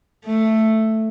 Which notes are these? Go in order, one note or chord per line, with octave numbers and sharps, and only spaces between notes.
A3